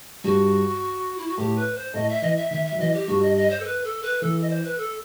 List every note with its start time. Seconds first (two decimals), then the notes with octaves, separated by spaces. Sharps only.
0.24 G2 G3 F#4
1.18 E4
1.27 F#4
1.37 A2 A3 G4
1.56 B4
1.75 C5
1.94 A2 A3 D#5
2.09 E5
2.22 E3 D#5
2.36 E5
2.51 D#3 E5
2.65 E5
2.72 F#3
2.79 E3 D#5
2.94 G4
3.07 G2 G3 F#4
3.22 D#5
3.36 D#5
3.50 C5
3.60 A4
3.64 B4
3.84 A4
4.02 B4
4.21 E3 A4
4.41 D#5
4.50 C5
4.64 B4
4.78 A4